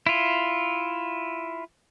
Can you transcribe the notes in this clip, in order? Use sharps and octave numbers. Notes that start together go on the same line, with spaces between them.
E4 F4